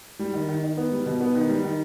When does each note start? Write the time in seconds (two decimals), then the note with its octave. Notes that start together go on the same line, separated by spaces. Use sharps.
0.19 G3
0.34 D#3
0.49 D#3
0.63 D#3
0.77 B3
0.92 G3
1.06 B2
1.20 B3
1.35 D#3
1.49 G3
1.64 D#3